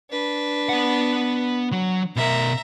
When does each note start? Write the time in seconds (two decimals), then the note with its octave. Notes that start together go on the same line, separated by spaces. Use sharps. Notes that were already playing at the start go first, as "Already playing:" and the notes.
0.10 D4 B4
0.69 B3 F#5
1.72 F#3
2.16 B2 A#4 E5 A#5